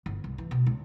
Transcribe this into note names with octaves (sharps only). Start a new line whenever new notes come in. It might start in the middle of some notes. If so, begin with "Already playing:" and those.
G1
C2
E3
B2
C#2